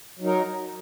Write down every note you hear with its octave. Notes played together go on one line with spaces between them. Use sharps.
F#3 D#4 A#4